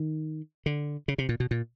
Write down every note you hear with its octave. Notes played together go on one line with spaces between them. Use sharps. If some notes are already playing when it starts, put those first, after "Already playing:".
Already playing: D#3
D3
C#3
C3
A#2
B2
A#2